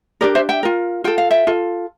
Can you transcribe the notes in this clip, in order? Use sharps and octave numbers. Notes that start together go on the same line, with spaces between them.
D4 G4 A#4 D5
C5 E5
E5 G5
F4 A#4
F4 A4 G5
F5
E5 G5
F4 A4